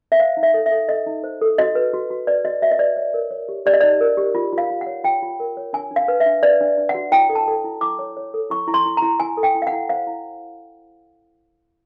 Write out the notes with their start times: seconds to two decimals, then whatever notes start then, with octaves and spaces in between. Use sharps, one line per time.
0.12 E5
0.19 C5 F5
0.37 D#4
0.43 E5
0.54 A4
0.66 E5
0.71 A4
0.89 A4 D#5
1.07 D#4
1.24 C5
1.41 A4
1.58 F#4 D#5
1.75 B4
1.93 F#4
2.10 F#4
2.27 B4 D5
2.45 F#4 D#5
2.62 F#4 E5
2.71 D#5
2.79 B4 D5
2.97 C#5
3.14 A#4
3.31 C#5
3.49 G4
3.66 G4 D5
3.73 D#5
3.81 D#4 D5
4.01 A#4
4.17 G4
4.35 F4
4.53 F4
4.58 F5
4.70 F4
4.81 F#5
4.87 C#5
5.04 F4 G5
5.22 F4
5.40 A#4
5.57 C#5
5.73 D4 G#5
5.91 D4 F5
6.08 B4
6.20 E5
6.26 D4
6.43 B4 D5
6.61 D4
6.78 D4
6.89 F#5
6.95 F#4
7.12 E4 G5
7.29 A4
7.35 A5
7.47 A4
7.64 E4
7.81 E4 D6
7.99 C#5
8.17 C#5
8.34 A4
8.50 E4 C#6
8.67 E4
8.74 C6
8.86 E4
8.97 A#5
9.02 E4
9.20 E4 G#5
9.37 A4
9.43 G5
9.55 E4
9.62 F5
9.67 F#5
9.73 E4
9.89 C5 F5
10.07 E4